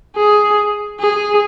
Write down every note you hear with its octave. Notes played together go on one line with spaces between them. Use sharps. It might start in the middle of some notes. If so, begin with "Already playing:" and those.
G#4
G#4